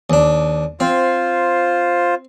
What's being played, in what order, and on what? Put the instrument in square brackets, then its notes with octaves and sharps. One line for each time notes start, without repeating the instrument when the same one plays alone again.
[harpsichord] D#2 D4
[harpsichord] C4 [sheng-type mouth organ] F4 C5